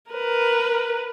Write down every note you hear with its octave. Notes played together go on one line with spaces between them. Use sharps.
A#4 B4